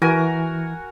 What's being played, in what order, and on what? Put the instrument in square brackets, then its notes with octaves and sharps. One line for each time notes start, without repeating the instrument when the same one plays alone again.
[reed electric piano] E3 [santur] F#4 A#4 G#5